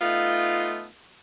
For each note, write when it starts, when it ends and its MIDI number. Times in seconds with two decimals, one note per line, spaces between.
0.01 0.85 57
0.01 0.85 59
0.01 0.85 63
0.01 0.85 65